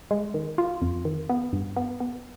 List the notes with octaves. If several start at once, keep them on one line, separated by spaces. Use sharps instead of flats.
G#3
D#3
F4
F2
D#3
B3
G2
B3
B3